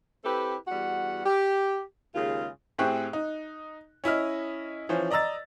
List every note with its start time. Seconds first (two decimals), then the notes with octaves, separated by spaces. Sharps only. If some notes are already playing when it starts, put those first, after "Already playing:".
0.25 C4 E4 G4 A4 B4
0.67 E2 G3 F#4 F#5
1.26 G4
2.15 D#2 C#3 G#3 F4
2.78 A2 C4 G4 G#4 C#6 F#6
3.13 D#4
4.04 C#4 E4 D#5 F6
4.89 E3 F3 C#4 C5
5.10 D5 D#5 A#5 E6 A6